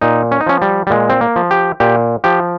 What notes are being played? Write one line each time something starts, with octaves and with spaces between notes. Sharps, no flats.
A#2 D#4
C#4
D#4
F3 C#4
G3
G3
A#2 G#3
C4
A#3
F3
G4
A#2 G4
F3 G4